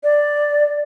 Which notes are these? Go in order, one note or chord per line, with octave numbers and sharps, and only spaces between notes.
D5